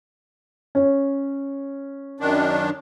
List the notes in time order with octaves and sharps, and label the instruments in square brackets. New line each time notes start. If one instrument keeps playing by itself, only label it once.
[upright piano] C#4
[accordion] F#2 D#3 D4